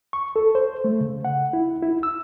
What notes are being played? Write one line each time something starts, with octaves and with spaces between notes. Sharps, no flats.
C#6
A4
C5
A3
C#3
F#5
E4
E4
E6